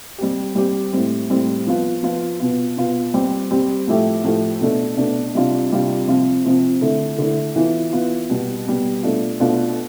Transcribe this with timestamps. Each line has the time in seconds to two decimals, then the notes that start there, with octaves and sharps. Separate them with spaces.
0.18 G3 C4 G4
0.55 G3 C4 G4
0.92 A2 G3 C4
1.30 A2 G3 C4
1.67 F3 B3 F4
2.03 F3 B3 F4
2.39 B2 B3 F4
2.77 B2 B3 F4
3.14 G3 C4 G4
3.51 G3 C4 G4
3.87 A2 F3 A3 E4 G4
4.24 A2 F3 A3 E4 G4
4.61 B2 A3 D4
4.97 B2 A3 D4
5.34 C3 G3 D4 F4
5.72 C3 G3 D4 F4
6.08 C3 F3 C4 F4
6.45 C3 F3 C4 F4
6.81 D3 A3 E4
7.18 D3 A3 E4
7.56 E3 B3 F4
7.93 E3 B3 F4
8.30 B2 G3 B3
8.66 B2 G3 B3
9.03 B2 A3 D4 F4
9.39 B2 A3 D4 F4